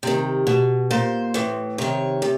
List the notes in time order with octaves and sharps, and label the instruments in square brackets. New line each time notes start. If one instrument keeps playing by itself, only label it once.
[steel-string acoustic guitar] C3 D#3
B2
A#2 C5
A2 E3
C3 D#3 C#5
C3